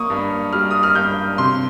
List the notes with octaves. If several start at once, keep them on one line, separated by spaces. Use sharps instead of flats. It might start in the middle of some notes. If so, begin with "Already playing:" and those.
Already playing: A#3 C#6 D#6
G2
G3 F6
D#6
F6
G2 G6
C3 C6